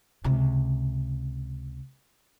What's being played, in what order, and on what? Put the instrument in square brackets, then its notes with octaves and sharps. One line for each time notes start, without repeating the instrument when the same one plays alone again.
[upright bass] C#2 C3